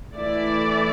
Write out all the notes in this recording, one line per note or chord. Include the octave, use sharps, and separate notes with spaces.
E3 A3 E4 D5